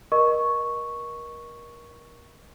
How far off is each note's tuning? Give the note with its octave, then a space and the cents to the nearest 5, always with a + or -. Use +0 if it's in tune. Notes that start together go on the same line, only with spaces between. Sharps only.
A#4 +30 D#5 -15 C#6 +0